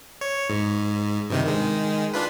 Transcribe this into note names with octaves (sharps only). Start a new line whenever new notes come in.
C#5
G#2
G2 C3 D#3
D#3 G#3
D4 F4 B4